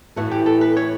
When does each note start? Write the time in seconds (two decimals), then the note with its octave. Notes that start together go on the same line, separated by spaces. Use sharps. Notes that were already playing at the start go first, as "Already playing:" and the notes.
0.16 A2 E3 A3 F#4
0.31 G4
0.46 A4
0.61 B4
0.77 C#5